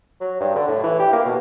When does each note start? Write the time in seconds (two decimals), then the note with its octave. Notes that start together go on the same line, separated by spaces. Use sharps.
0.21 F#3
0.40 G2
0.55 D3
0.68 A2
0.83 E3
0.99 G4
1.12 A#3
1.25 B2